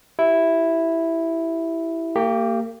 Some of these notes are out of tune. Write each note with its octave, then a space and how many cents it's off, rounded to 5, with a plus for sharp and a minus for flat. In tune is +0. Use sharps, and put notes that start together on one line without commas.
E4 +0 G4 -20
A#3 -35 G4 +5